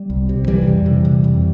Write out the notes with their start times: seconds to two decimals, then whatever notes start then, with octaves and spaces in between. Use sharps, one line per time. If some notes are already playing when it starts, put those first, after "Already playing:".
Already playing: G3
0.10 C2
0.29 C3
0.47 C3 E3 G3
0.67 F2
0.86 C3
1.05 C3
1.24 F2